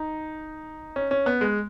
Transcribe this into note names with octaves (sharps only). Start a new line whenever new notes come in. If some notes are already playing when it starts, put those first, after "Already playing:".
Already playing: D#4
C#4
C#4
B3
G#3